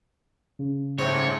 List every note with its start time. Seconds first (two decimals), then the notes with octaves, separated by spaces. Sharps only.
0.59 C#3
0.99 G#2 A3 C4 D#4 C5 C#5